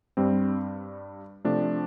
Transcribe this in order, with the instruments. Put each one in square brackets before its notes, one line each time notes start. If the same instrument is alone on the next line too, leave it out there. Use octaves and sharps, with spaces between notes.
[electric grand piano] G2 G3 C4
C3 F3 A3 D4